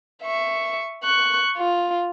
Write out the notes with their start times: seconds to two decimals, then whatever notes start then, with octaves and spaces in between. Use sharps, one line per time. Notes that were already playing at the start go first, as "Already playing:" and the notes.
0.23 E5 C#6
1.04 C#6 F#6
1.57 F4